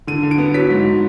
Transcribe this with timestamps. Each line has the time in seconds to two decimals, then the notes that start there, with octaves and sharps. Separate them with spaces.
0.07 D3 D#7
0.23 D3
0.31 D7
0.38 B3
0.54 F#3 B6
0.70 G#2